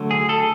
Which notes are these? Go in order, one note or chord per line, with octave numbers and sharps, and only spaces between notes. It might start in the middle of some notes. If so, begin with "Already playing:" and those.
Already playing: D3 F#3 A3
G#4
A4